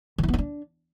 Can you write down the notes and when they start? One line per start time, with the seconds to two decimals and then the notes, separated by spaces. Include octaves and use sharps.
0.18 E3
0.23 E4
0.28 B3
0.34 D#4
0.39 D4